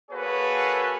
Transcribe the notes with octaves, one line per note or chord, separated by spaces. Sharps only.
A#3 F#4 G#4 A4 B4 C#5